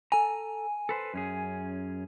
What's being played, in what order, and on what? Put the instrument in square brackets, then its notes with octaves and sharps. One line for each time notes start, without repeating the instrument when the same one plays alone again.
[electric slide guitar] A4 A#5 [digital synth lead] G#5
[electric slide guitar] A4 B4 C5
F#2 C#4 G#4